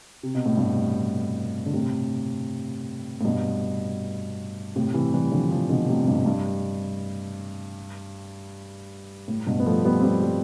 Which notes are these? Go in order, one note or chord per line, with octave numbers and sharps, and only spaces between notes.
C3
B2
A2
G2 B2
D3
A2 C3
A2
G2 B2
A2 C3
C3 E3
E3 G3
D3 F3
D3 F3
B2 D3
A2 C3
G2 B2
G2
A2
G2 B2
B3
F3 A3
G3 B3
C4
G3 B3
G3